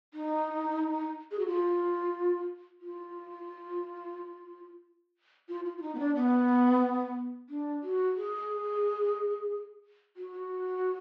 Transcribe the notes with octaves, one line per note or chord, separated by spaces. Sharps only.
D#4
G#4
F#4
F4
F4
F4
F4
F4
D#4
B3
D4
B3
D4
F#4
G#4
F#4